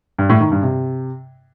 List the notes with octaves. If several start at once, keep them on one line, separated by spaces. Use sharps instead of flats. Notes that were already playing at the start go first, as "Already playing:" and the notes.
G2
A2
D#3
G2
C3